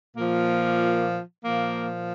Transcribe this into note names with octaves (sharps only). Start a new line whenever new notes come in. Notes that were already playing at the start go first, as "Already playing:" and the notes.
A#2 F3 A#3
A#2 F3 A#3